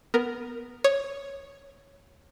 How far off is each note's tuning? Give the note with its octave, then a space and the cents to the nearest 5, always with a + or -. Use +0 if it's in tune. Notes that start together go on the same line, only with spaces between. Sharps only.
B3 +0 A#4 +0
C#5 +0 D#6 -5